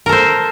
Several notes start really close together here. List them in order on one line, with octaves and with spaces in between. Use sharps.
A#4 A4 C5